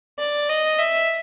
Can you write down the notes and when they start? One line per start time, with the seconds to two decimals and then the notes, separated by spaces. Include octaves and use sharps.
0.19 D5
0.49 D#5
0.79 E5